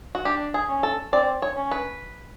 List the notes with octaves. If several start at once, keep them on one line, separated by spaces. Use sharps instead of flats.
F#4
D4 G4
G#4
C#4
A4
C4 D5
C#5
C#4
B4